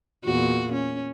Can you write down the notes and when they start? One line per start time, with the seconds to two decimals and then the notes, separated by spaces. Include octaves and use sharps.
0.25 E2 A#2 F#4
0.72 C#4